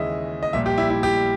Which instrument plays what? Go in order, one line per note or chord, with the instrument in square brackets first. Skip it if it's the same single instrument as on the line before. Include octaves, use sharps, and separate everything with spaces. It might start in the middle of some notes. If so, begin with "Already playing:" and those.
Already playing: [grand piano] D#2 C#3 E3 G#3 D#5 E5
D#5
A#1 A#2 G3 E5
G4
E4
E4
G4